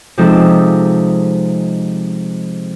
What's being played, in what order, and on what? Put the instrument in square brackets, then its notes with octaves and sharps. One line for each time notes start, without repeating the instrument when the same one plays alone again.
[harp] C3 F3 G#3 C4 D#4 A4